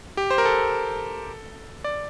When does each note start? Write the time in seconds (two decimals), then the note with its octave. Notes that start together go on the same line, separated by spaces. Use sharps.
0.17 G4
0.30 C5
0.38 A#4
0.45 A4
1.84 D5